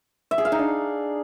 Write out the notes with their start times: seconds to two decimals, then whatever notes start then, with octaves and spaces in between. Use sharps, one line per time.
0.31 E5
0.38 G#4
0.45 F5
0.52 D#4
0.59 D4